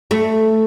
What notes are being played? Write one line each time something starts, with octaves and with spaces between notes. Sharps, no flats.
A3